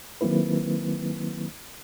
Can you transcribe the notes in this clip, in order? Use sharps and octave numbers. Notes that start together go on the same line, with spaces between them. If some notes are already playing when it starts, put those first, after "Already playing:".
D#3 F#3 A#3 C4 E4 B4